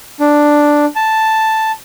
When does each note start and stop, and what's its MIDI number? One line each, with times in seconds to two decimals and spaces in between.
0.20 0.85 62
0.96 1.72 81